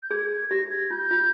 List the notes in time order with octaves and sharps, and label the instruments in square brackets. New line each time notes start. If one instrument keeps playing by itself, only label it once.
[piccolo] G6
[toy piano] G#4 [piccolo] G#6
[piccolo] G#6
[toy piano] G4 [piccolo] A#6
[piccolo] G#6
[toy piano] F4 [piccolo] G6
[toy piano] F4